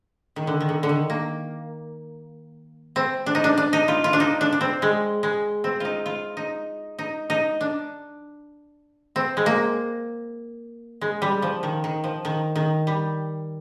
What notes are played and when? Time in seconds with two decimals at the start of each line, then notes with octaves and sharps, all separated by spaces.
0.36 D#3
0.47 D3
0.61 D#3
0.69 D3
0.83 D3
0.89 D#3
1.10 A#3
2.96 C4
3.26 D4
3.35 D#4
3.44 D4
3.58 D4
3.73 D#4
3.88 F4
4.04 F4
4.13 D4
4.20 D#4
4.41 D4
4.53 D4
4.61 C4
4.82 G#3
5.23 G#3
5.64 C4
5.80 D#4 F4
6.06 F4
6.37 D#4
6.99 D#4
7.30 D#4
7.61 D4
9.16 C4
9.37 G#3
9.46 A#3
11.01 G#3
11.22 G3
11.42 F3
11.63 D#3
11.84 D#3
12.04 F3
12.25 D#3
12.56 D#3
12.87 G3